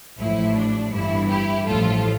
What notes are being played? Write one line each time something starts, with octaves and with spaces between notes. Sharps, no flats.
A1 A2 F3 E4
D4
G1 G2 E3 E4
E4 G4
A1 A2 F3 F4 A4